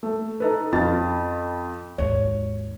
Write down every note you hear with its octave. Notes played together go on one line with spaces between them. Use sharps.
A3
D#4 A4 B4
F2 C#4 F4 A6
G#1 D#2 C#5